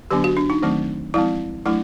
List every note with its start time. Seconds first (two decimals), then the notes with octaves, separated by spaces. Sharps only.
0.11 D3 F#3 B3 D4 G4
0.24 F#4
0.37 D4
0.50 D#4
0.63 D#3 F#3 A3 C4
1.14 F3 G#3 C4 E4
1.66 F#3 A3 D4 E4